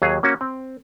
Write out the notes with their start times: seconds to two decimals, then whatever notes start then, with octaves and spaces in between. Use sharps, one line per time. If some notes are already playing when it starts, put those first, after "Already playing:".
0.02 D#2 F#3 G#4 F5
0.23 A#3 C#4 F#4
0.41 C4